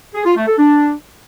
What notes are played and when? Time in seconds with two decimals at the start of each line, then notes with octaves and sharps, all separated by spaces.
0.15 G#4
0.25 F4
0.36 A3
0.47 A4
0.58 D4